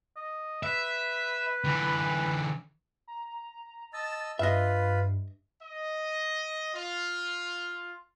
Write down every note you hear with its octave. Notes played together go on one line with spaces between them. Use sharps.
D#5
B4 E5
D3 E3
A#5
D#5 A5 E6 A6
G2 F4 B4 D#5 E5
D#5
F4